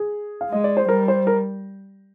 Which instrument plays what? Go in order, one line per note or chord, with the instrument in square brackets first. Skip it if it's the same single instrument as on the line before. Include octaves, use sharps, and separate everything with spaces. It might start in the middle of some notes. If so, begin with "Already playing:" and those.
Already playing: [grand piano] G#4
F5
[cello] G#3 [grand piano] D#5
[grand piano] D5
C5
[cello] G3 [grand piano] A#4
[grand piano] C5
A#4